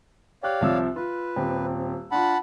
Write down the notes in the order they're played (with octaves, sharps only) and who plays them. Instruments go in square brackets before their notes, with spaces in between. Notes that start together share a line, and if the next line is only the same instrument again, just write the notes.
[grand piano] G4 F#6 [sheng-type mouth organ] C#5 D5 F5
[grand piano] C2 F3 E6
[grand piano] F4 [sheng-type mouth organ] B4
[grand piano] D#1 C4 G4
[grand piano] D4 F4 [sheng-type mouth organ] F#5 A5 B5